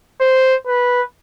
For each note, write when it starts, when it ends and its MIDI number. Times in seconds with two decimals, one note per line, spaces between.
0.20 0.55 72
0.67 1.01 71